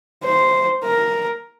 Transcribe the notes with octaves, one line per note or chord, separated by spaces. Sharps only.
C5
A#4